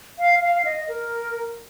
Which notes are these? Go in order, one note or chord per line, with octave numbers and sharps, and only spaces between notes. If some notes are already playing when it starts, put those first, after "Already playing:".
F5
F5
D#5
A#4